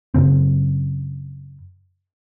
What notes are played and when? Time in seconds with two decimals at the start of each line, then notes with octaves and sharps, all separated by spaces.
0.14 F#2 C#3 C4